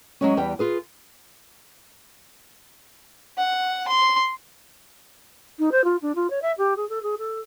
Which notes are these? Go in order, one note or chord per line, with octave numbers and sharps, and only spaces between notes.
F#3 G#3 C#4
E2 G3 B4 G5
F4 G#4 B4
F#5
C6
D#4
C5
F4
D4
F4
C#5
E5
G4
G#4
A4
G#4
A4